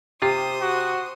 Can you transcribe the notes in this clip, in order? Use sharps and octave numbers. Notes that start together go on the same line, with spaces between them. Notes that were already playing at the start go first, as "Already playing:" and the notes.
C3 F4 G4 C5 D#6
F#4